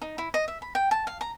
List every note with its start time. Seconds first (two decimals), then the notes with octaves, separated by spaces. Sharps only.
0.02 D#4
0.18 E4
0.34 D#5
0.48 E5
0.62 B5
0.75 G5
0.91 A5
1.07 F5
1.21 A#5